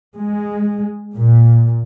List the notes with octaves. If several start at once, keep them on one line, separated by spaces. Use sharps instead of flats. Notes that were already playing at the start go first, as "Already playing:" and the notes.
G#3
A#2